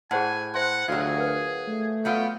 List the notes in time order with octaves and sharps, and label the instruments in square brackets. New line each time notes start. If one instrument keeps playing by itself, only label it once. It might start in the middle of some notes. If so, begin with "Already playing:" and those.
[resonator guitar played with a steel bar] A2 [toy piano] G#4 C5 F#5 [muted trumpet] G#5
[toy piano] C5 E5 C6 [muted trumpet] F#5
[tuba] D2 [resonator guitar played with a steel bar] F#3 F4 [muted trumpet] G#4
[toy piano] A#4 B4
[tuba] A3
[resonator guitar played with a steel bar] F#3 B3 F4 [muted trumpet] G5